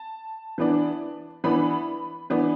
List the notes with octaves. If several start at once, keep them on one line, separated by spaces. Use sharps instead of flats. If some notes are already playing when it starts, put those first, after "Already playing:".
Already playing: A5
E3 B3 D4
E3 B3 D4 B5
E3 B3 D4